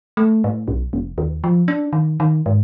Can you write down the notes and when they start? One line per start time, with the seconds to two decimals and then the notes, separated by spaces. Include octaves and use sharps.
0.17 A3
0.44 A2
0.68 B1
0.93 F1
1.18 D#2
1.44 F3
1.68 D4
1.93 D#3
2.20 D#3
2.46 G#2